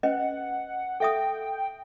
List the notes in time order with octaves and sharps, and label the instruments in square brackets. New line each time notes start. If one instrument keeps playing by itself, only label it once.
[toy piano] C#4 B4 D#5 [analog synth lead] F#5
[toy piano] A4 E5 D#6 [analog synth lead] G5